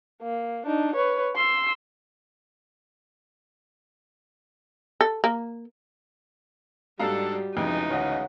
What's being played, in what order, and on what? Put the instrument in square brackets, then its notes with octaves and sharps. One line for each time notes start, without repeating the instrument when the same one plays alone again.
[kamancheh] A#3
D4 D#4
B4 C#5
C6 E6
[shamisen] A4
A#3
[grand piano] G#2 F5 A#5 [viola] G3 [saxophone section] D4 A4 [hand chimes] F#4
[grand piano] F1 F2 [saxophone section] C#3 E3 G#3 [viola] D#4
[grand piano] D1 D#5 [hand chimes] C#5 F5 F#5